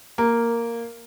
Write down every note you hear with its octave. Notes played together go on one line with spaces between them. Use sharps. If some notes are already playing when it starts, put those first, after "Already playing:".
A#3